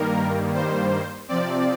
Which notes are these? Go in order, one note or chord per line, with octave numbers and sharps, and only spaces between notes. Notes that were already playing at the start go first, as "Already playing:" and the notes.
Already playing: G2 D#3 G3 A#3 A#4
C5
C3 F3 C4 D5